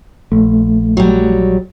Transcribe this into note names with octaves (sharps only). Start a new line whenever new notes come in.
A#1 A3
F#3 G3